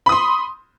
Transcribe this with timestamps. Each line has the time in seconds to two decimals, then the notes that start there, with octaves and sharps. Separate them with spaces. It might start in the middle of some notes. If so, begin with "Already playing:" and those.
0.06 B5
0.09 D#6
0.12 C6